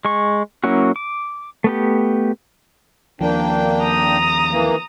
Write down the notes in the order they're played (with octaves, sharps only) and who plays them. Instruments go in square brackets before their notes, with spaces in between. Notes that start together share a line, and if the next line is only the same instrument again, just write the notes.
[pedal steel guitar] G#3 C#6
F#3 A#3 C#4 E4 F#4
D6
A3 B3 G4
[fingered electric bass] D#2 F3 [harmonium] A#3 D4 G5
[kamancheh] A#5 D#6
[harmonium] E3 A#3